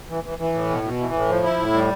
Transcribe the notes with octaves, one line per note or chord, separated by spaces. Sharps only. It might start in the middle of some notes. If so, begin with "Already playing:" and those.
E3
E3
E3
A2
B2
B2
E3
A2
F3
E4
A2
G3